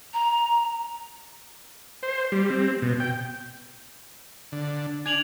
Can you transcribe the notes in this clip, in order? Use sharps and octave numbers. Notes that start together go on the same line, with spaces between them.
A#5
C5
G3
C4
B2
G5
D3
D4 G#5 G#6 F7 F#7